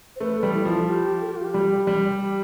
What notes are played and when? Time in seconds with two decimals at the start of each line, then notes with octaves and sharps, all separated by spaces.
0.16 C5
0.20 A3 B4
0.37 A4
0.43 G3
0.54 E4
0.65 F3 F4
0.87 G4
1.21 A4
1.28 G4
1.36 F4
1.44 G4
1.54 G3
1.87 G3
2.20 G4